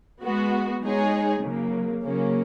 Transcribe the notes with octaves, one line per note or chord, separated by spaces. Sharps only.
G#3 B3 F#4
G#3 D#4 G#4 C#5
C#3 F#3 A#3
C#3 F#3 A#3 C#4